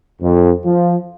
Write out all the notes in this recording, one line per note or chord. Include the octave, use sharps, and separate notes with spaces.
F2
F3